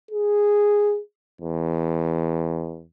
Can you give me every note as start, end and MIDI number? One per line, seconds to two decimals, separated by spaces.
0.11 1.00 68
1.41 2.84 40